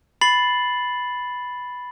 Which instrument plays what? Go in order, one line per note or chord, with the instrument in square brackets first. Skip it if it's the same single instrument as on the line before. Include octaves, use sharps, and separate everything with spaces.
[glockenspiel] B5 A6 C7 F#7